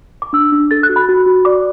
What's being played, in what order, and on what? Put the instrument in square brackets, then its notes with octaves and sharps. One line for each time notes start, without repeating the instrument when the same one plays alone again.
[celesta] D6
D4 E6
D4
A4 A6
F#6
F#4
B5
F#4
F#4
D5 D6